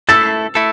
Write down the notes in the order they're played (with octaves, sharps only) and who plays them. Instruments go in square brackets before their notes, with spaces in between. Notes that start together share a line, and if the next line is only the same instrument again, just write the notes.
[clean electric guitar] A3 E4 A4 [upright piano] E6 A6
[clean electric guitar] A3 E4 A4